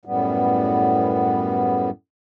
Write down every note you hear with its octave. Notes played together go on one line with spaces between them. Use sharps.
F#2 A2 G3 B3